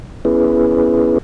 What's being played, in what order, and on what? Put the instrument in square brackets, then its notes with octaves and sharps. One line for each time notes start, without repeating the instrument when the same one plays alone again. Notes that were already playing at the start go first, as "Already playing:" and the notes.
[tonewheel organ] B3 C#4 E4 G#4 B4